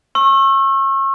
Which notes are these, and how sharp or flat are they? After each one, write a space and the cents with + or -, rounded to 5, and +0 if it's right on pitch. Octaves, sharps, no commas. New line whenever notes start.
C#6 -35 E6 +15